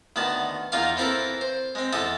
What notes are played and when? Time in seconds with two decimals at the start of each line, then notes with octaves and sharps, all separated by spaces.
0.16 D2 D#3 B3 A5
0.72 E2 A#3 D#4 F4 F5 C6
0.97 E3 C4 E4 A4 A#4
1.41 C5
1.75 G#3 C4
1.93 E2 G#3 A4 E5 D#6